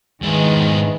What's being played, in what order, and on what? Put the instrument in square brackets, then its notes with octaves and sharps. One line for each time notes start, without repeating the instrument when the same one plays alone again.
[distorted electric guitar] G#2 E4 [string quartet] D#3 G#3 B3